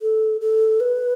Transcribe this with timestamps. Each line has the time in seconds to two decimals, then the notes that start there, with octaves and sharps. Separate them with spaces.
0.02 A4
0.41 A4
0.80 B4